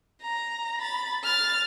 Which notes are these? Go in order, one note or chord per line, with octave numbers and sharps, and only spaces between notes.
A#5
B5 A6
F6 A6